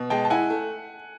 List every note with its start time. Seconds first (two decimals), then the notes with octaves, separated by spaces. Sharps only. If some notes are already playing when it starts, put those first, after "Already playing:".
Already playing: B2
0.10 G#3 G5 A5
0.25 A5
0.30 E4 F#5 G#5
0.50 A3